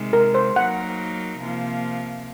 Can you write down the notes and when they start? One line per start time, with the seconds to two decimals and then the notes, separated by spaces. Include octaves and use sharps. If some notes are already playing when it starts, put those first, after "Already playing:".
Already playing: C3 D#3 G#3
0.13 A#4
0.35 C5
0.55 F#3 A#3 D#4 A#4 F#5
1.40 C3 F3 A#3